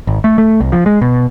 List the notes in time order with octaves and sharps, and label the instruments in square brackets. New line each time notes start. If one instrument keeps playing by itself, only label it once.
[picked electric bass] G#1
A3
A3
C2
F3
G#3
B2